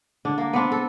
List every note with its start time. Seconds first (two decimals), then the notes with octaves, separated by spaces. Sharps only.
0.25 D3 D4
0.38 A#3
0.53 B3 C4 D4
0.72 A4